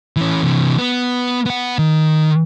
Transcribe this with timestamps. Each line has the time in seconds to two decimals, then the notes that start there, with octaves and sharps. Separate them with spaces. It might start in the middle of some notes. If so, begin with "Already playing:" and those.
0.16 E3 C#4
0.43 C3 E3
0.78 B3
1.46 B3 F#5
1.79 D#3